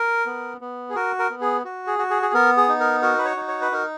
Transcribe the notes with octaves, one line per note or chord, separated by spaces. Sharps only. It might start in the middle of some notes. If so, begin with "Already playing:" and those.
Already playing: A#4
B3
B3
G#4
F#4 A#4
A#4
B3
G#4
F#4
G#4
F#4
G#4
G#4
B3 A#4
G#4
D#4
A#4
F#4 A#4
B4
C#5
D#4
C#5
B4
D#4 A#4